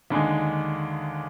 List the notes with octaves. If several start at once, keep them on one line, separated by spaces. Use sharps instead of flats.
D#2 D3 G#3 D#4